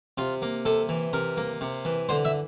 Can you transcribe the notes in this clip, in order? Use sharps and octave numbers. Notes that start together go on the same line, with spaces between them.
C3 F4
A#3
C3 A4
E3
C3 A#4
A#3
C3
E3
D3 C5
E5